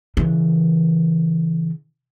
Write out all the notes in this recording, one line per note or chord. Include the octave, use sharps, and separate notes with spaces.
C#3 E3